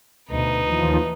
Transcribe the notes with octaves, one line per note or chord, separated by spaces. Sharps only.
D2 B2 D#4 B4
D#2 E3 F3